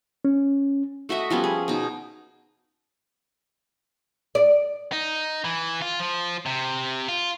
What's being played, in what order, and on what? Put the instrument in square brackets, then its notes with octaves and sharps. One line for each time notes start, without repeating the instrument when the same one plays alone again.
[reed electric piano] C#4
[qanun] A3 F#4 D#5 E5
F3 G3 B3 C#4
G#4
B2 D#4
[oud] D5
[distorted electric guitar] D#4
E3
F4
F3
C3
F4